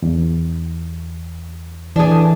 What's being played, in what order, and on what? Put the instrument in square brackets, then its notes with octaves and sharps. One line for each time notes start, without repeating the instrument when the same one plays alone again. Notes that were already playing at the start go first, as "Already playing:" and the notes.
[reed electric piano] E2
[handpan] E3 [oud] D4 G#4